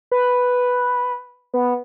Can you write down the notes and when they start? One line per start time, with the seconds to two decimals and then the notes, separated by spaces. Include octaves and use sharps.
0.12 B4
1.54 B3